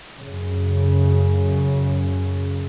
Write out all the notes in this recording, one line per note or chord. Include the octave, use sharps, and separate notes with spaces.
F#2 C#3